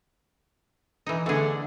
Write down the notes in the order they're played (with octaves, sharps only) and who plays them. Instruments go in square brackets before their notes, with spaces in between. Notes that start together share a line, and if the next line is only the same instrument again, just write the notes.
[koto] E3 D#4
[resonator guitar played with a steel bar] E2 D3 [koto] A3 G#4